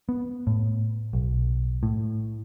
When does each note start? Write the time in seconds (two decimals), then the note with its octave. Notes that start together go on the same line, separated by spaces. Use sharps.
0.09 B3
0.47 A2
1.13 B1
1.83 A2